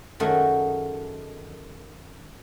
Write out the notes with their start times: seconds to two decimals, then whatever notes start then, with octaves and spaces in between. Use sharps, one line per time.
0.20 F#2 D#3 A3 F#4 G#4 D#5